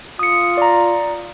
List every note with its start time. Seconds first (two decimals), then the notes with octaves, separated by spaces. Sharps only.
0.19 F4 D#6 C#7
0.57 D5 A#5